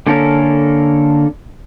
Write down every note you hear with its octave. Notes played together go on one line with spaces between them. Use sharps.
D3 A#3 C#4 A4 A#4